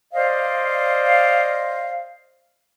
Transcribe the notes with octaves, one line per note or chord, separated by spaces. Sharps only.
C5 D5 D#5 F5